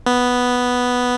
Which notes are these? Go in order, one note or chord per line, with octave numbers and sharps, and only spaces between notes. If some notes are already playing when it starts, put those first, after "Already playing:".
B3